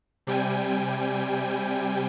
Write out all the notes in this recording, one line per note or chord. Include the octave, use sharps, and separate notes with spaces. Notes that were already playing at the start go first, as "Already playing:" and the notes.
C3 G3 G5 G#5